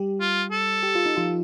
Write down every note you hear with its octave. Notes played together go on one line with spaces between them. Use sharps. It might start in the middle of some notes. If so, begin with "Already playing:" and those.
Already playing: G3 G4
F4
A4
G4
F4
D#4
F3 F4